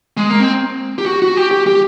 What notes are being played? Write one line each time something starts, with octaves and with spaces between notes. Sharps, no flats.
G#3
A#3
C4
G4
F#4
F#4
G4
G4
G4